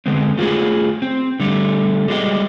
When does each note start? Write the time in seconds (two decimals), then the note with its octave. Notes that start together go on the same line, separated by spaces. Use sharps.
0.06 D3 G#3 B3 C4
0.37 A3 F4 F#4 G#4
1.02 C4
1.40 D3 G3 A3
2.08 G3 G#3 F#4 D#5